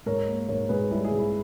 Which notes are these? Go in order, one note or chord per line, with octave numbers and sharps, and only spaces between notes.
G#2 A#4 C#5
A#3
G#2 A#4 C#5
G#2 G#4 B4
G3 E4 G#4
E4 G#4
G#2
E4